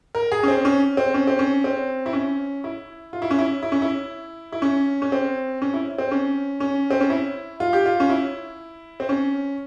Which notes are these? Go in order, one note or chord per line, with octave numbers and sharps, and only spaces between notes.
A#4
G#4
C#4
C4
C#4
C4
C#4
C4
C#4
C4
E4
C#4
E4
F4
E4
C#4
E4
E4
C#4
E4
E4
C#4
C#4
C4
C#4
E4
C4
C#4
C#4
C4
C#4
E4
F4
G4
F4
C#4
E4
C4
C#4